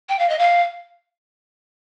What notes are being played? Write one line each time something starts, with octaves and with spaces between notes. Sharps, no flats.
G5
F5
D#5
F5